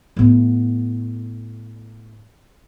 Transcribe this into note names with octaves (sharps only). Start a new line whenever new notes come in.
A2 B3